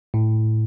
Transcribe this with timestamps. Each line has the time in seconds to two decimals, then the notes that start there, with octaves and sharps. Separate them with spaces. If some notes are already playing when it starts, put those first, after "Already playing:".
0.14 A2